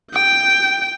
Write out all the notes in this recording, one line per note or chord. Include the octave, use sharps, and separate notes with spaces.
G5 G6